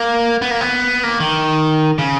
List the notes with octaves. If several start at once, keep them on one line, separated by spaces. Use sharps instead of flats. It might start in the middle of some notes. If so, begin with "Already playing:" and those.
Already playing: A#3
B3
A#3
B3
A#3
D#3
C#3